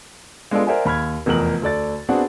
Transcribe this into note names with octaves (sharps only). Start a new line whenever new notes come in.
G#3 B3 D4 F4 A4 D5
A#4 C5 D5 E5 F#5 G#5
D#2 B5 F6 G#6
F1 E2 A#4 F#7
D2 A4 D5 A6
B3 C4 D4 F#4 G#4 F#5